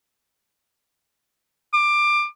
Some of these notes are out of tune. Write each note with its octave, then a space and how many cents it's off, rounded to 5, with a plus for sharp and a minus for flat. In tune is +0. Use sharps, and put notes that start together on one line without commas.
D6 +20